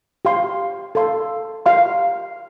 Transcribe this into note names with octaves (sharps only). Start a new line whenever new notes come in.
G4 F5 C6
A4 F5 C6
G4 F5 C6